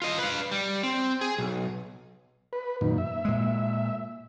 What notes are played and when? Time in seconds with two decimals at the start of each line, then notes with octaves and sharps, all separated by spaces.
0.02 F4 D#5
0.18 B4 F5
0.51 G3
0.83 C4
1.21 G#4
1.38 B1
2.53 B4
2.81 F#2 A#2 D#3
2.98 E5
3.25 A#2 G#3